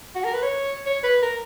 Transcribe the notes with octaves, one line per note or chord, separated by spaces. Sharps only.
F#4
A#4
B4
C#5
C#5
B4
A#4